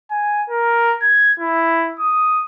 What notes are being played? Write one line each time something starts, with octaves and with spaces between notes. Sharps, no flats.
G#5
A#4
G#6
E4
D#6